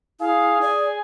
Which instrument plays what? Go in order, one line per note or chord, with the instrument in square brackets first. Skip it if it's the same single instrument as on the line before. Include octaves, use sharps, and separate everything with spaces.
[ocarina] E4 [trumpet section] G#4 [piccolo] F5
[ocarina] D5 [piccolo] G#5